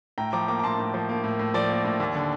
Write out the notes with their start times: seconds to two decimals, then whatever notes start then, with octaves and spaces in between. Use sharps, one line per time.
0.18 A2 G5 A#5
0.33 F3 A#5 D6
0.48 A#3 A#5 D6
0.59 A#5
0.63 A2 A5 C6
0.79 A2
0.94 F3
1.09 A#3
1.24 A2
1.39 A2
1.54 F3 D5
1.69 A#3
1.84 A2
2.00 D#2
2.15 D3